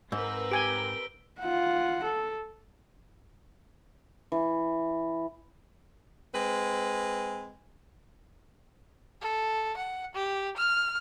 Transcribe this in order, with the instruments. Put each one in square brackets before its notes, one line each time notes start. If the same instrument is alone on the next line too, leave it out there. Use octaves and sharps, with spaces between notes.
[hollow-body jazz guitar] G#2 [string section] C4 A#4 B4 [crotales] E6
[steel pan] G4 G#5 [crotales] D7 G7
[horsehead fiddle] F4 F#5
A4
[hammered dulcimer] E3
[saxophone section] G#3 C4 B4
[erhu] A4
F#5
G4
F6